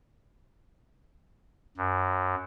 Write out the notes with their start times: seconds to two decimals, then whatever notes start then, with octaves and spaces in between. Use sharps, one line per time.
1.77 F#2